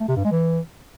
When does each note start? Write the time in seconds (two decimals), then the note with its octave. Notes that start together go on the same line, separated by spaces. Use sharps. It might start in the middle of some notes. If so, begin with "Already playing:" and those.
0.01 A3
0.09 C3
0.16 G2
0.24 G#3
0.32 E3